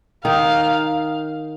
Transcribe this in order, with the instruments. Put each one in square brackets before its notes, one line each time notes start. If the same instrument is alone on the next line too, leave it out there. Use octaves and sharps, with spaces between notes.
[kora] D#3 D#4 [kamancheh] F5